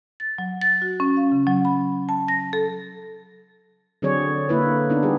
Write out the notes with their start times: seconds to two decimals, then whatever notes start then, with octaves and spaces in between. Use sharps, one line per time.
0.20 A6
0.38 F#3
0.62 A6
0.82 F#4
1.00 C#4
1.17 F5
1.32 C#3
1.47 F#3
1.65 B5
2.09 A5
2.28 A#6
2.53 A4
4.02 D3 F#3 C4 G#4 C#5 D5
4.49 D3 A#3 E4 B4
4.90 B3 D4 D#4
5.03 G3 G4 G#4